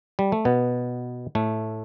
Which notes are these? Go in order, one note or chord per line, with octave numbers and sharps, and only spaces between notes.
G3
A3
B2 B3
A2 A3